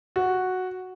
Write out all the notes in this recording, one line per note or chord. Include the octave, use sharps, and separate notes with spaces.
F#4